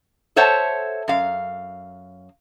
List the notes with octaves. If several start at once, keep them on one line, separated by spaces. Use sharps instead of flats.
A4 C5 C#5 E5 F#5 A5
F#2 F5